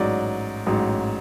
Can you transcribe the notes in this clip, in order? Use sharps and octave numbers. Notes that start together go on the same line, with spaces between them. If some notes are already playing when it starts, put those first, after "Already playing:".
Already playing: A1 G#2 F#3 D5
A1 G#2 F#3